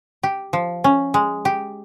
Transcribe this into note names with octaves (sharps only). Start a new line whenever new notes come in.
G4
F3
C#4
G#3
G4